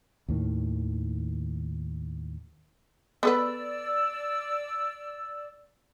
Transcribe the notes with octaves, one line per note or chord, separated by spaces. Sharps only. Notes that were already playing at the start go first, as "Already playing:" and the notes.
D#2 A2 D#3
B3 A4 B4 D5 E6